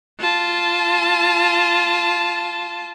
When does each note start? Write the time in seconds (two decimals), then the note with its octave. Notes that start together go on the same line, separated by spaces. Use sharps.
0.20 F4 A5